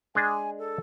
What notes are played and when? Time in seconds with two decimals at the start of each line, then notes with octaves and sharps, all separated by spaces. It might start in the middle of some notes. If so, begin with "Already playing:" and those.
0.15 G#3 D4 G#4 G#5
0.58 A4